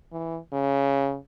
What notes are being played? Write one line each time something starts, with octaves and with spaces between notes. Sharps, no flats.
E3
C#3